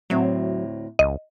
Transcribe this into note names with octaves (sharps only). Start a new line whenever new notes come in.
D2 A2 F#3 C4
C#2 D#5